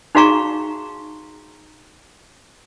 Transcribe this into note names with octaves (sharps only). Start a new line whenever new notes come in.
D#4 F#4 G#4 F5 A#5 C#6